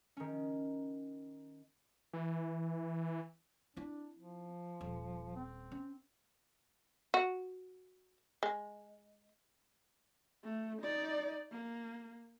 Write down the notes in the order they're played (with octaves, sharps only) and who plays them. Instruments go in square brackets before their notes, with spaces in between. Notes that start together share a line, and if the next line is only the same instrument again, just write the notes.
[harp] D#3 C#4
[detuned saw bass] E3
[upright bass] C4 E4 [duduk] D4
[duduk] F3
[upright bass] D#1
[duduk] C4
[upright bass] C#4
[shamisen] F#4
G#3
[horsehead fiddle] A3
D#4 D5
A#3